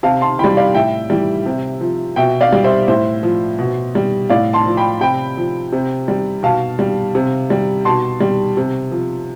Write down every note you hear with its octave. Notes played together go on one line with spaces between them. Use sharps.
C3 F5 A5
A5 C6
E3 G3 G5 B5
D5 F5
A2 E5 G5
E3 G3
C3
F3
B2 E5 G5
D5 F5
G3
C5 E5
A2 C5 E5
F3
B2
G3
A2 D5 F5
A5 C6
F3
G5 B5
C3 G5 B5
F3
C3
G3
B2 F5 A5
G3
C3
G3
B2 A5 C6
G3
C3
F3